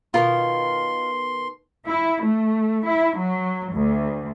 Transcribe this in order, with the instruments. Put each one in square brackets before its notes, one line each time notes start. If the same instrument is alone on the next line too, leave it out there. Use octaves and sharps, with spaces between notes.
[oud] B2 D#3 [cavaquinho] F4 A#4 [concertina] C6
[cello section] E4
A3
E4
F#3
D2